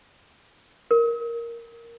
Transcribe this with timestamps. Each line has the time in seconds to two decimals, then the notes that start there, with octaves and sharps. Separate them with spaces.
0.91 A#4